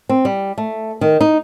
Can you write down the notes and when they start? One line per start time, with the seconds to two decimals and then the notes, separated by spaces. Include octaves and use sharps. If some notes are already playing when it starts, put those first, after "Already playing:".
0.09 C4
0.25 G3
0.58 A3
1.01 D#3
1.21 D#4